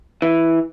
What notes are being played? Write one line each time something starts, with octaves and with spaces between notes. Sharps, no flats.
E3